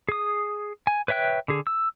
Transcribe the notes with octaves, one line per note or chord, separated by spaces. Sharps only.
G#4 D#6
G#5
B4 C#5 E5 G5 F#6
D3 G#4
E6